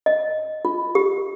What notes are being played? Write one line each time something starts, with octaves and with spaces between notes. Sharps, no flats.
D#5
F4
G4